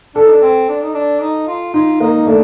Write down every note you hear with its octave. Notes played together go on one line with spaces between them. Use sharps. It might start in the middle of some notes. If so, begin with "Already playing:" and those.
D4 A4
D#4
D4
C4
D4
D#4
D4
D#4
F4
D#4 F4
A#3 D#4
A3 D4